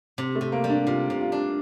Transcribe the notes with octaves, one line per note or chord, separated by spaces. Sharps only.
C3
A3
C3
A#3
G3
D4
C3 F4
C3
F4
D4